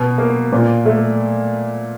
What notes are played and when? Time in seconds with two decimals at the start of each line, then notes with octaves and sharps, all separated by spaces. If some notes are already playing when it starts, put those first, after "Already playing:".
Already playing: B2
0.18 A#3
0.52 A#2
0.85 A3